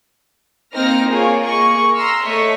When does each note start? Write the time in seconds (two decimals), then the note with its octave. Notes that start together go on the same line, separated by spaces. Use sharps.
0.74 A#3 C4 D#4 F6 A#6
1.10 A#3 F4 G#4 A#4 C#5
1.42 A#3 G#4 D#5 C#6
1.94 A#5 C6 E6 F6
2.25 A3 C#5 D#5 E5 C#6